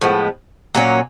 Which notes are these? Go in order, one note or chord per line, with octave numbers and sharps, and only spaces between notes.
A2 F3 G#3 B3
A#2 F#3 A#3 C#4